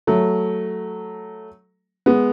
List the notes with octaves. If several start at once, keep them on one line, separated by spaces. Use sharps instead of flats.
F#3 A3
G#3 B3